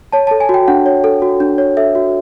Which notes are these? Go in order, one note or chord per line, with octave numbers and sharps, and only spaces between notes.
C#5 A5
A5
A4
G#5
F#4 G5
D4 F#5
C#5
A4
F#4
D4
C#5
A4 E5
F#4